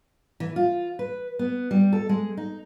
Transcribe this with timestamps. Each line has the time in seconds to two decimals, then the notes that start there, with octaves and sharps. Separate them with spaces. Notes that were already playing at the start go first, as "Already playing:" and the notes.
0.40 E3
0.56 F4
0.99 B4
1.39 B3
1.71 G3
1.93 A4
2.09 G#3
2.37 D#4